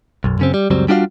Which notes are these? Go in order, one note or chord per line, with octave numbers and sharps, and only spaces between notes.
B1 F#2
F#2 C#3 C4
G3
C#2 F#2 F#3 G3 C4
G3 D4 F4 F#4 D5 F5